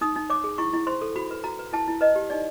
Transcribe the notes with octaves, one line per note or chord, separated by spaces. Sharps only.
D#4 D#6
D#4
C#5 D6
G#4
E4 C#6
E4
C5 C6
A4
F#4 B5
B4
F#4 A#5
B4
E4 A5
E4
B4 D#5
G4
D#4 D5